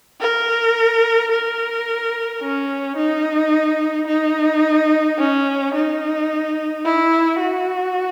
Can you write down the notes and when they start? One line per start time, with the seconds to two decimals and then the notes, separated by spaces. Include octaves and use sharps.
0.20 A#4
1.31 A#4
2.42 C#4
2.97 D#4
4.07 D#4
5.18 C#4
5.74 D#4
6.85 E4
7.40 F#4